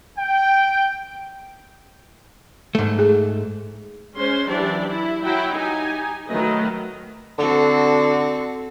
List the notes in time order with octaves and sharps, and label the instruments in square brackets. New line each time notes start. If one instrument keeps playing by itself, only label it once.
[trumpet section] G5
[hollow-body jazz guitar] G#2 A3
[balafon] G#4
[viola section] G#3 C#4 C5 C6
E3 F#3 D4 G4 D5
E4
F#3 E4 F#4 G5
D#4 G4 G#5
D#3 F#3 A3 B4 D#5
[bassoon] D3 [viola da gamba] C4 F#4 A4